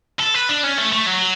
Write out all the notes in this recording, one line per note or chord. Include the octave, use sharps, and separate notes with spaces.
A4
B4
D4
C#4
A3
A3
F#3